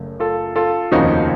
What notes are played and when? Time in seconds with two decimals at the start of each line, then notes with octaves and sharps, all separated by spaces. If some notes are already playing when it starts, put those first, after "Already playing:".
Already playing: F#1 F#2 C#3 A3
0.20 F4 A4
0.56 F4 A4
0.91 F1 D#2 C#3 F3 A#3 D#4 F#4